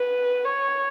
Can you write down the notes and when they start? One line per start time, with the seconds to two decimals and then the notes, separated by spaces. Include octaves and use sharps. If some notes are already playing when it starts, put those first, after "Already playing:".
Already playing: B4
0.45 C#5